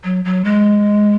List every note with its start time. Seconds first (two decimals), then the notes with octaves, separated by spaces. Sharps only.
0.04 F#3
0.25 F#3
0.45 G#3